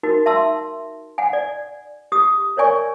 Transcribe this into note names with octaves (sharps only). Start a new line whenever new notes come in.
D#4 F#4 A#4
E5 A5 C6 E6
F#5 G#5
D5
G4 D#6
A#4 C#5 D5 G#5 C#6